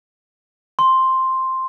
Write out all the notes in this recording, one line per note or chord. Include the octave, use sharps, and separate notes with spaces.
C6